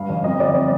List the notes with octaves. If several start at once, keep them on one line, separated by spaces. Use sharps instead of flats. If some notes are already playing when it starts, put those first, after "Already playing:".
Already playing: G2 F5
A1
F2 D#5
G1 D5